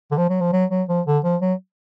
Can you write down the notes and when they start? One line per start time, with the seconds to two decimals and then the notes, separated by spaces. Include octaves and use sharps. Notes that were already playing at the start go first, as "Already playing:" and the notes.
0.11 D3
0.18 F3
0.30 F#3
0.41 F3
0.53 F#3
0.71 F#3
0.89 F3
1.06 D3
1.24 F3
1.41 F#3